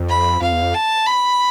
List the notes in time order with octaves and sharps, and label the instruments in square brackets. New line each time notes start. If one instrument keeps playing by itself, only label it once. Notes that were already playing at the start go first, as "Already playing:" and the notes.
Already playing: [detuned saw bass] F2
[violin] B5
[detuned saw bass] F2 [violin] F5
[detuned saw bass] E2
F2
[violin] A5
B5